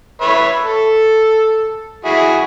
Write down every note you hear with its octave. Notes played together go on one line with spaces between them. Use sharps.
B4 C#5 E5
A4
E4 F#4 G#4